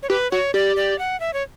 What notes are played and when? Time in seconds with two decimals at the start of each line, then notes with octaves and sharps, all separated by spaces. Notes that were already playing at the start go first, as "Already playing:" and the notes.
0.03 C#5
0.10 G4 B4
0.31 F#4 C#5
0.54 G4 D5
0.76 D5
0.99 F#5
1.20 E5
1.34 C#5